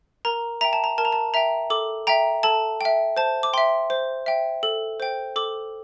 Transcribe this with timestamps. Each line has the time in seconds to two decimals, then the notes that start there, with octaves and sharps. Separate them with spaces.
0.25 A#4 A#5
0.61 E5 G5 A#5
0.73 A5
0.84 A#5
0.98 A#4 A5
1.05 A#5
1.12 A5
1.34 E5 G5 A#5
1.70 A4 D6
2.07 E5 G5 A#5
2.43 A4 A5
2.81 E5 G5
3.17 C5 A5
3.43 D6
3.53 E5 G5 C6
3.90 C5
4.26 E5 G5
4.63 A4
5.00 C5 G5
5.36 A4 D6